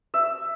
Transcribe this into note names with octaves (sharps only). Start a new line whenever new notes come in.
E5